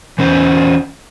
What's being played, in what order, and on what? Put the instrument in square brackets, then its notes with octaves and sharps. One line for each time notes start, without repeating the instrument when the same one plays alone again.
[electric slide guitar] E3 C#4 C5